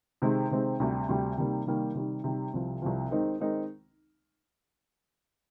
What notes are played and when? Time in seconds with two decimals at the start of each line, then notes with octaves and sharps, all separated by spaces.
0.22 C3 D#3 G#3 C4
0.51 C3 D#3 G#3 C4
0.80 D2 C3 G3
1.09 D2 C3 G3
1.37 C3 D#3 G3 A#3
1.66 C3 D#3 G3 A#3
1.95 C3 D#3 G3
2.24 C3 D#3 G3
2.54 C2 C3 F3
2.82 C2 C3 F3
3.11 D#3 G#3 C4 D#4 A#4
3.39 D#3 G#3 C4 D#4 A#4